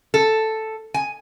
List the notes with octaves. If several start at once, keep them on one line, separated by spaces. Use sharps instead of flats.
A4
G#5